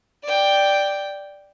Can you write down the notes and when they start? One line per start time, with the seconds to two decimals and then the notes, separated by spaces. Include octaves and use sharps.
0.24 D5 G5